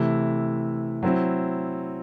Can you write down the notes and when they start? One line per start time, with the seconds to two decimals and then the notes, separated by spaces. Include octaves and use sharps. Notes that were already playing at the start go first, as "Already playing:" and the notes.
Already playing: C3 E3 A3 E4
1.03 F#3 C4 E4